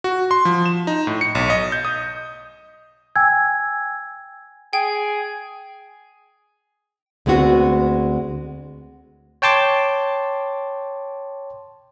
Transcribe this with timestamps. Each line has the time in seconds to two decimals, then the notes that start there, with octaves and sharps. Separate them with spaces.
0.04 F#4
0.31 C6
0.45 F3
0.66 E7
0.87 D#4
1.07 A2
1.21 C#7
1.35 B1
1.50 D#5
1.72 G6
1.85 D#6
3.16 G5 G#5 E6 G#6
4.73 G#4 G5
7.26 D2 G#3 B3 C4 F#4
9.42 C#5 G5 A5 C6 D6